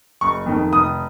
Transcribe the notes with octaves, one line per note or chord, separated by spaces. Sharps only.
F#1 C#6
F2 D#3
F1 D#6